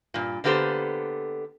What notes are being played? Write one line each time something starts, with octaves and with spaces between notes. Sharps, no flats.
G2 A#2
D3 A#3 B3 G4 A4 C5